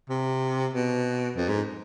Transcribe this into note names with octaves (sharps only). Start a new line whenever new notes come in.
C3
B2
F2
G#2